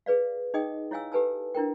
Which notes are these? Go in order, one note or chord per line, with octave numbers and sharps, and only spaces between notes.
G#4 B4 D5 F5
D#4 G#4 D#5 G5 D#6
E4 C#5 F5 G#5 E6
G4 A4 B4 G#5 A5 E6
D4 E4 A#4 G5